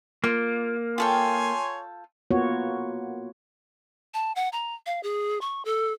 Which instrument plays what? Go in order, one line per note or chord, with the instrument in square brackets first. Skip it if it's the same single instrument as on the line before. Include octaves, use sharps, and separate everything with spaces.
[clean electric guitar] A#3 [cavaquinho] F4
[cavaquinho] F4 A4 G5 [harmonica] C#5 G#5 C6
[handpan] A#3 B3 F4 F#4 C#5
[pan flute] A5
F#5
A#5
F5
G#4
C#6
A4